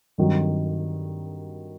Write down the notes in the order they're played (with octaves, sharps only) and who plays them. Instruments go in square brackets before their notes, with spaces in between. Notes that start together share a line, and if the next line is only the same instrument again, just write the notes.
[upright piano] G2 D#3 F#3 C4